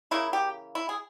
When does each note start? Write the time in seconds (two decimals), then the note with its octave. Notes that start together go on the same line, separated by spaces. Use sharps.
0.11 C#3 E3 A#3 E4
0.33 G4
0.75 E4
0.89 G#4